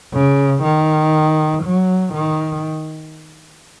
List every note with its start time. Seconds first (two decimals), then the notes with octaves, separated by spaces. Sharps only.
0.13 C#3
0.63 D#3
1.64 F#3
2.14 D#3